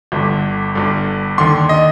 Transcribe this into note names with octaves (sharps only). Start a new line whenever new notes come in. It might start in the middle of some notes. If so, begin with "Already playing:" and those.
G1 G2 D3
G1 G2 D3
D#2 D3 C6
D#5